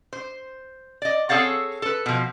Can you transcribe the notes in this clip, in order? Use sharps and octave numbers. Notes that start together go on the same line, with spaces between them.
C5
D5 D#5
C4 G#4 A4 C#5 F5 F#5
A4 B4
B2 F3